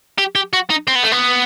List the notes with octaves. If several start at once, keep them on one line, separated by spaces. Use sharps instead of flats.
G4
G4
F#4
D#4
C4
B3
A3
B3